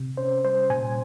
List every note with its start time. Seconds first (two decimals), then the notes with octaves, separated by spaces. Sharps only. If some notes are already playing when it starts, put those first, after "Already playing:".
Already playing: C3
0.17 C#4 C5
0.44 G3 C5
0.70 A#2 G#5